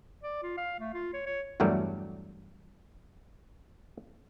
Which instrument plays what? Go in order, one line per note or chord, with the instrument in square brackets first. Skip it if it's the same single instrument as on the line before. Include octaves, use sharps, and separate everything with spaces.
[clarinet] D5
F4
F5
A3
F4
C#5
C#5
[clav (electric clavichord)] E2 G2 F#3 G3 A3 A#4